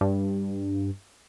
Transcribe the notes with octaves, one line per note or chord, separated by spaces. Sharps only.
G2